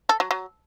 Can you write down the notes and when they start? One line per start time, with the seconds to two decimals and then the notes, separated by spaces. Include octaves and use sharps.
0.09 A4
0.20 F#3
0.31 F#3